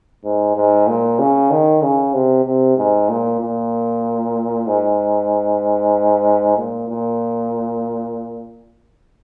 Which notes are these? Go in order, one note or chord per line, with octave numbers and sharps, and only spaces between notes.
G#2
G#2
A#2
C#3
D#3
C#3
C3
C3
G#2
A#2
A#2
G#2
A#2
A#2